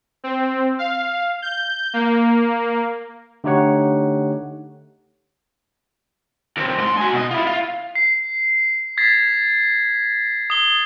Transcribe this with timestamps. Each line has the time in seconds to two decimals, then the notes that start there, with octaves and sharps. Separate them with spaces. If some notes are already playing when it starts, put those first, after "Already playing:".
0.24 C4
0.79 F5
1.42 G6
1.94 A#3
3.44 D3 A3 D#4 G4 C#5 F#5
6.57 D#2 C4
6.78 G#2 C6
6.98 F#4 G#5
7.13 B2 D#5
7.31 E4 F4
7.47 F4
7.95 C7
8.98 G#6 A6 B6 C7
10.50 D#6 G7